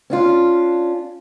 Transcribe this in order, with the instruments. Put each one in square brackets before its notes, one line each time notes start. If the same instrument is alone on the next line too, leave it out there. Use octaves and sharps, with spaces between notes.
[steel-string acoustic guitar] C#4 D4 F4